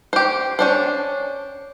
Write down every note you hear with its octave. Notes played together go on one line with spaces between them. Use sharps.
G4 C5
C#4 D4 C5